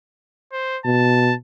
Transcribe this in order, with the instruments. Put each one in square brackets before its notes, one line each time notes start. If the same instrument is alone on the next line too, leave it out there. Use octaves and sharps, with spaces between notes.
[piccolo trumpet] C5
[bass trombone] B2 [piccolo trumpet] A5